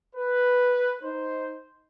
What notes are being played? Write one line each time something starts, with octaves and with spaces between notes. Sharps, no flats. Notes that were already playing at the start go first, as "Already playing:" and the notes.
B4
D#4 C5